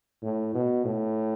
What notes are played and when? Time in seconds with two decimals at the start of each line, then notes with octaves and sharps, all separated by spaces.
0.23 A2
0.54 B2
0.85 A2